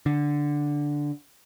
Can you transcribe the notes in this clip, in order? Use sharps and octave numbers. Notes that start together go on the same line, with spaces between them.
D3